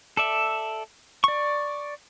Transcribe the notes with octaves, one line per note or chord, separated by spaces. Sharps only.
A4 D5 E5
D5 C#6